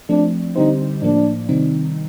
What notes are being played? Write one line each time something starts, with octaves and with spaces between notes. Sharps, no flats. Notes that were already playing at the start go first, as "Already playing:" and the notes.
F3 A3 C4 D4
D3 G3 C4 D#4 G4 C5
A2 F3 A#3 D4
C3 D#3 G3 C4 D#4